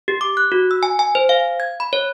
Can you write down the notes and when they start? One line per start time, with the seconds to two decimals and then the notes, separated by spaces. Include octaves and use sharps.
0.08 G4
0.21 D6
0.37 F#6
0.52 F#4
0.71 E6
0.83 G#5
0.99 G#5
1.15 C5
1.29 F5
1.60 G#6
1.80 B5
1.93 C#5